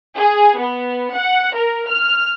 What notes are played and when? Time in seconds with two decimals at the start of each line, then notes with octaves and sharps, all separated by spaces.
0.18 G#4
0.60 B3
1.16 F#5
1.57 A#4
1.89 F6